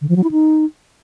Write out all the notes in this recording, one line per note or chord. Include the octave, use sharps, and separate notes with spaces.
D3
F3
F#3
E4
D#4